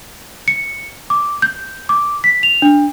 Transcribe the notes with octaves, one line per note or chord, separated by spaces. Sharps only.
C#7
D6
G6
D6
B6
F7
D4